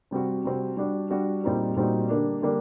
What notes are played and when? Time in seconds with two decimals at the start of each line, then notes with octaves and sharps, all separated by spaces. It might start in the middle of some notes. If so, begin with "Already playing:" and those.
0.11 C3 G3 C4 F#4
0.44 C3 G3 C4 F#4
0.77 G3 D4 F#4
1.10 G3 D4 F#4
1.44 A#2 G3 C4 D#4 F#4
1.76 A#2 G3 C4 D#4 F#4
2.09 D3 G3 A#3 D4
2.42 D3 G3 A#3 D4